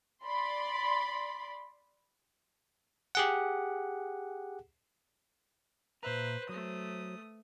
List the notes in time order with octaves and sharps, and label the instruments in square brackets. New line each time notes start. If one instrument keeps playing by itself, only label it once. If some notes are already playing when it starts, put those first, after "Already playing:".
[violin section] D5 B5 C6
[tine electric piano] G4 G#4 F#5
[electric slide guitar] A#2 E5 A#5 [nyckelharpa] B4 C5
[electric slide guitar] F#3 C5 [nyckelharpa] A3 D#6